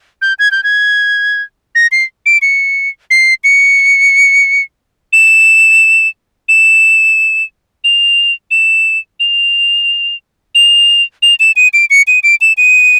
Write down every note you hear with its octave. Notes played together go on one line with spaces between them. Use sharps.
G6
G#6
G6
G#6
A#6
C7
D7
C#7
C7
C#7
E7
E7
F7
E7
F7
F7
F7
E7
D#7
D7
C#7
D#7
D7
E7
D#7